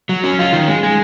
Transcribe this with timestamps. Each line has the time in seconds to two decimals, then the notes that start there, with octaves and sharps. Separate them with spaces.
0.09 F#3
0.24 C#4
0.39 F4
0.53 D#3
0.68 G#3
0.83 G#3